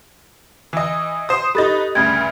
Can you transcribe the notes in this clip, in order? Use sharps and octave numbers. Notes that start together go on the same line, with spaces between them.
E3 D#5
C5 D#6
D#4 G4 A4 B4 A6
D2 G2 C#3 G#6